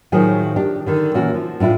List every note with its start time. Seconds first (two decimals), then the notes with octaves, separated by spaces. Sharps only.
0.12 A2 D#3 F3 F#3 G#4
0.56 D4 G4
0.86 D3 D#3
1.14 A#2 E3 C#4 F#4
1.34 F3
1.60 A2 D4 E4 F4